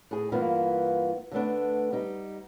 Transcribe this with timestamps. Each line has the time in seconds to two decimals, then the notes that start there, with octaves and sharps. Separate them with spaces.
0.11 A2 G#4
0.32 G2 E3 A#3 B3 E4 F4
1.32 D3 G3 A3 B3 D4
1.93 G3 D#4